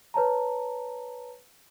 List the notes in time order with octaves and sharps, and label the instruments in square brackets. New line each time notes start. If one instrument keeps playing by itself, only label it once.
[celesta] B4 C#5 A5 A#5